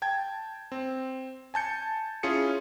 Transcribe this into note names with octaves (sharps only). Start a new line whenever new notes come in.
G5 A5 G#6
C4
G#5 A5 G6 C#7
C#4 E4 F4 G#4 C#7